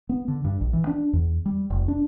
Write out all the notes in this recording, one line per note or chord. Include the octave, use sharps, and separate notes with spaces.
B3
D3
G2
A#1
E3
D4
E2
G3
F1
D4